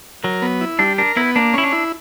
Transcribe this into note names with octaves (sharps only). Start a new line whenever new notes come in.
F#3 A#4
B3
E4
G3 D4
D4 A#4
B3 E4
A#3 D4
C#4 E4
D4
E4